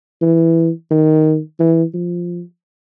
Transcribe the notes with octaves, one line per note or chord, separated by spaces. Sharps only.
E3
D#3
E3
F3